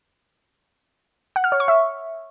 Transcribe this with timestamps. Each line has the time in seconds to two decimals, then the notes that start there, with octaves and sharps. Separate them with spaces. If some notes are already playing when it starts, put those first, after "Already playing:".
1.36 F#5
1.44 F6
1.52 C#5
1.60 C#6
1.68 E5